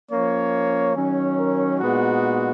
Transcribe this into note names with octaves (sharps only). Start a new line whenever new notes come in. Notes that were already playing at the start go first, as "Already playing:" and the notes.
F3 A#3 C#4 C#5
D#3 F#3 C#4
A#4
A#2 G#3 B3 D#4 F#4